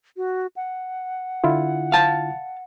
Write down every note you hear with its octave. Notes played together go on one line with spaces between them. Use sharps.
F#4
F#5
D3 E4 F4
F5 A5